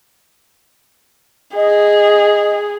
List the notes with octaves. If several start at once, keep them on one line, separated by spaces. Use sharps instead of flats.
G#4 D#5